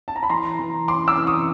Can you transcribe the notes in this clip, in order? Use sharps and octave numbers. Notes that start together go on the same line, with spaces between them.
A5
A#5
B5
E3 A#5 C6
E3
C#4 C6 D6
D6 E6
E3
C#6 D#6